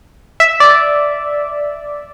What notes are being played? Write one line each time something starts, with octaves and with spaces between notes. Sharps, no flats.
E5
D5